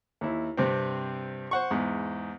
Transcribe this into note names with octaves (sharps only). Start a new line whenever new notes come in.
D#2 E4
G2 C3 C4
C5 F#5 C#6
E2 G#2